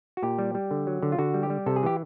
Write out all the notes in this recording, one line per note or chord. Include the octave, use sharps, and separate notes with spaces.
F#4
A#2 G4
G3
G3
D3
F#3
D3
F4
D3 F#4
G3
G4
G3
C3 A4
G#4
E3 G4